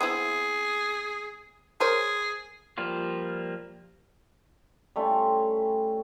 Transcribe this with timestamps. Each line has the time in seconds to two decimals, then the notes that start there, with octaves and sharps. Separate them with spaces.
0.01 B3 C4 E4 G#4
1.80 G#4 A#4 C5 C#5
2.78 F3 G3 A#3 F4
4.96 G3 A3 C#4 F4